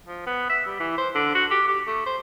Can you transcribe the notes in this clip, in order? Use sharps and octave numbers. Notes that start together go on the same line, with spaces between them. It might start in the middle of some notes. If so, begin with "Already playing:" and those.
F3
B3
E5
G3
E3
C5
D3
F#4
G4
G4
A3
C5